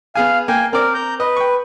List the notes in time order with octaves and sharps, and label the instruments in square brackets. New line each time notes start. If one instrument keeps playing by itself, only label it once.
[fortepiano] B3 G#4 G#5 [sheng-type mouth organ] F5
[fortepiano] A#3 [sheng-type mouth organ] G5 G#5
[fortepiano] C4 D5 [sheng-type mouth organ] A#4
[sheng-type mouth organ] A#5 G6
[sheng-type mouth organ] B4 [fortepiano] D#5
[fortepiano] G5 C#6